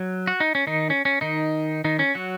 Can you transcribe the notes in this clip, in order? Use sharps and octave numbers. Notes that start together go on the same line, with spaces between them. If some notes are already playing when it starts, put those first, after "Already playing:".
Already playing: F#3
F#4
D#4
C#4
D#3 D#4
C#4
C#4
D#3 D#4
D#3 D#4
C#4
F#3 F#4